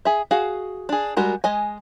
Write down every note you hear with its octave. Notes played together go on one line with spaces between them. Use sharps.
G#4 E5
F#4 G#4 F5
D4 G#4
G3 G#3 F#4 A#4
G#3 D#5 G#5